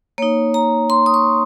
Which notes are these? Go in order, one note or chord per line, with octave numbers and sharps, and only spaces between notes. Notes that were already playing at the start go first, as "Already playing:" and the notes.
A#3 D#4 C#5
A#5
C6
D#6
C#6